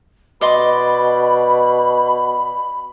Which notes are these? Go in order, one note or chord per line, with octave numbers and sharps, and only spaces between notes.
B2 D5 D#5 B5 C6